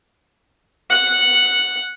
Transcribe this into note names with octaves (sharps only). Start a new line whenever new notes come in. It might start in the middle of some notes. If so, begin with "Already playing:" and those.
F#5